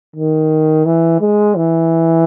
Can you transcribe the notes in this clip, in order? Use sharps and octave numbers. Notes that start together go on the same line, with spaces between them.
D#3
E3
G#3
E3